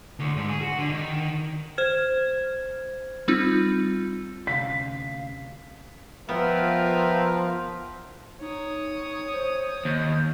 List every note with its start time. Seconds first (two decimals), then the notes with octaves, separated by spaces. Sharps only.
0.19 D2
0.37 G#2
0.49 G#4
0.61 F#4
0.78 D3
0.90 D#3
1.78 C5 F6 G#6
3.28 G3 C4 D#4 F4
4.47 D2 C3 C#4 F5 B6
6.29 F3 B3 F4 A#4 B4 E5 F5 G5
8.41 D#4 C#5 D#6
9.33 C5
9.85 D#2 G6